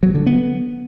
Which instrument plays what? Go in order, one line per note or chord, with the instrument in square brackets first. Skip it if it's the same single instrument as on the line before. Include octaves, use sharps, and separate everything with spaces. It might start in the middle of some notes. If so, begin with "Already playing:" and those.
[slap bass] F#3
D3
B3